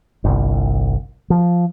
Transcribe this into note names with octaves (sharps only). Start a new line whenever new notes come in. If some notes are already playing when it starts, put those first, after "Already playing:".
G1 C2
F3